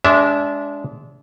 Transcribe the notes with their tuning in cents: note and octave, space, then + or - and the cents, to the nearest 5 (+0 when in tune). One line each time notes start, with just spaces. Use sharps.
G#3 +0 D4 -25 E5 +0